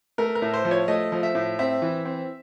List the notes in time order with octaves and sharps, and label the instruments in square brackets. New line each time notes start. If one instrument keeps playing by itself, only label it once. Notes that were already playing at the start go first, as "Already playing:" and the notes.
[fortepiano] A3 A#4
A#4
A2
C5
F3
C#5
A3 D#5
F3
E5
A2
C4 E5
E3
C4